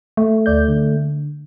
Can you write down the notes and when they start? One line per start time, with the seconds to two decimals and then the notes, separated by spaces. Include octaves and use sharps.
0.17 A3
0.46 D2 D5 G6
0.68 D3